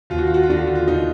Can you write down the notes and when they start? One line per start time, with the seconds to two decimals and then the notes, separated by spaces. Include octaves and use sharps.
0.10 D#2 F4
0.18 F#4
0.27 F4
0.34 F#4
0.43 F4
0.49 D3 F#4
0.58 F4
0.67 F#4
0.75 F4
0.87 D#2 D#4